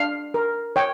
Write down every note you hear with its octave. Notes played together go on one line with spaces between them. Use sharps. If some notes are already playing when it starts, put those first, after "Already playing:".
Already playing: D4 F5
A#4
C#5 G5